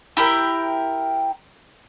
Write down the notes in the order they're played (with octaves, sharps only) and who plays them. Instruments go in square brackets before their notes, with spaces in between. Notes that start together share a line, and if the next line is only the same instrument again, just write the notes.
[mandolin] E4 G4 A#4 G5